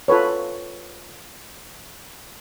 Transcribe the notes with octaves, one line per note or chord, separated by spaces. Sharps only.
F4 A4 B4 C#5